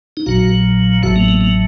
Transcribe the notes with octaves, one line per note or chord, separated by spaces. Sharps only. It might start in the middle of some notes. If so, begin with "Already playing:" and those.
D#4
A#1 A#2 F#3 F#4
A1 A2 F#3 F#4
A#3
A#3
A#3